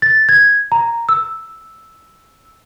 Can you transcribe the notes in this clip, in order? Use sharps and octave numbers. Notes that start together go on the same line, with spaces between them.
A6
G#6
A#5
E6